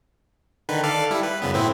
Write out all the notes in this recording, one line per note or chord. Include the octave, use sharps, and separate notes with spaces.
D3 D#3 B4
A4 D5 F5
G3 E4
B4
F#2 C#3 B3
A2 C4 E4